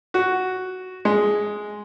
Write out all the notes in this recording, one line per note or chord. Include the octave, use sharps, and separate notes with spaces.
F#4
G#3